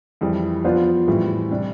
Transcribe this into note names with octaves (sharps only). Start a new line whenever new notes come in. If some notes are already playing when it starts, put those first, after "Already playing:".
F2 E3 G3
F3 B3 D4 F4 C5
A2 E3 G3 C4
C3 G3 D4